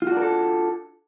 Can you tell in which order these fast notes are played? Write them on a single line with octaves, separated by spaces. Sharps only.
F4 F#4 D4 A#4 A4